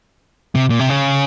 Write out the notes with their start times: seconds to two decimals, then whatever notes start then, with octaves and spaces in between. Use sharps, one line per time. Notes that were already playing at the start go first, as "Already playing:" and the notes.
0.55 C3
0.70 A#2
0.79 C3
0.90 C#3